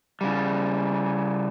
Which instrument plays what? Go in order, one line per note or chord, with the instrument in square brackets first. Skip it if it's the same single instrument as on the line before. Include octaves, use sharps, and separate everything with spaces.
[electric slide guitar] C#3 G3